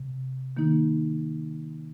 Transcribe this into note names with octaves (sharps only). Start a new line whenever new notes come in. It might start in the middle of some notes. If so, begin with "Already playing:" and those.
Already playing: C3
D#3 A#3 D#4